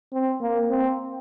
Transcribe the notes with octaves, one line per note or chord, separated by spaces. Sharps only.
C4
A#3
C4